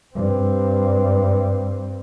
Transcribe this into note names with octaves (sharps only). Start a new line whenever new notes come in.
G2 C4